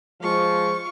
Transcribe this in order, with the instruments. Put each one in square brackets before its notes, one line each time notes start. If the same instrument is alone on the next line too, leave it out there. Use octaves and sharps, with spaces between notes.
[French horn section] F3 G#3 [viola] F4 C#6